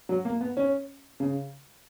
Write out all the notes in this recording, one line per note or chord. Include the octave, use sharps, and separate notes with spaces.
F#3
A#3
B3
C#4
C#3